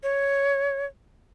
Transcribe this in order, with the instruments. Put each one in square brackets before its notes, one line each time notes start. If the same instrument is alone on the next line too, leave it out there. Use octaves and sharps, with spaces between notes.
[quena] C#5